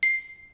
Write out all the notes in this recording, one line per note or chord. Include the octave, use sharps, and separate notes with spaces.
C7